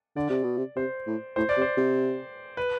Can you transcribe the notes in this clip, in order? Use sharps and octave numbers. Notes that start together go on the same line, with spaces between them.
D3 D5
C3
B2
C3
C3 C5
A2
A2 C5
D5
C3
C5
C3
B4